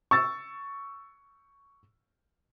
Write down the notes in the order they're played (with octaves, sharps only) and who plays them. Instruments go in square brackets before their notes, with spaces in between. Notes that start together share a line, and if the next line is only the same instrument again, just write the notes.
[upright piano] C#6 E6 A6